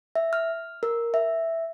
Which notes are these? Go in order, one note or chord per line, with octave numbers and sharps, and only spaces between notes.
E5
F6
A#4
E5